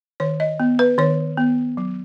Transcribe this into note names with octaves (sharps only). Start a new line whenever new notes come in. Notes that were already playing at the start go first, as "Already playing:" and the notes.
D#3 C#5
D#5
B3
B4
D#3 C#5
B3
F#3